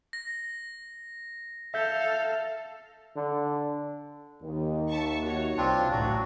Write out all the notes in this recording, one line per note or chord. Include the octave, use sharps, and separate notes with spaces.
A#6
A4 E5 F5 G6
D3
D#2
E5 A5 C#6
F#4 C#5
C2 C4 D4 F4
A1 D2 F#3 F#4